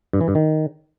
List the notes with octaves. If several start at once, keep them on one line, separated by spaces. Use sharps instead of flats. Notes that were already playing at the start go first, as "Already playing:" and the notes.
G2
E3
G2
D#3